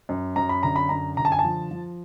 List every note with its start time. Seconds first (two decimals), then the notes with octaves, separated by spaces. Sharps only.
0.09 F#2
0.36 F#2 A#5
0.49 B5
0.63 D3 A#5
0.76 B5
0.89 F#2 A#5
1.17 D3 A#5
1.25 A5
1.32 G#5
1.39 A5
1.44 F3
1.71 F3